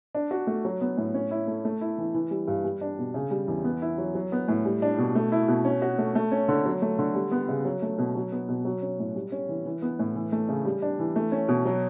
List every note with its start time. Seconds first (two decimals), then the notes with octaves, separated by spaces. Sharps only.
0.15 D4
0.31 F#4
0.47 A3
0.65 F#3
0.81 B3
0.97 A2
1.14 C#4
1.31 E4
1.47 A3
1.65 A3
1.81 E4
1.98 E3
2.14 E3
2.31 G3
2.48 G2
2.65 G3
2.81 D4
2.99 B2
3.14 C#3
3.31 G3
3.48 E2
3.64 B3
3.82 E4
3.98 F#3
4.15 F#3
4.32 B3
4.48 A2
4.65 G3
4.82 D4
4.98 B2
5.15 A3
5.32 E4
5.48 B2
5.65 C#4
5.82 F#4
5.98 A3
6.15 A3
6.32 C#4
6.48 D3
6.65 F#3
6.82 A3
6.99 D3
7.15 G3
7.32 B3
7.49 C#3
7.65 F#3
7.82 A3
7.98 B2
8.15 F#3
8.32 B3
8.49 B2
8.65 F#3
8.82 C#4
8.99 A2
9.15 G3
9.32 C#4
9.49 E3
9.66 E3
9.82 B3
9.99 A2
10.16 E3
10.32 A3
10.49 C#3
10.65 G3
10.82 D4
10.99 E3
11.16 A3
11.32 C#4
11.49 B2
11.66 F#3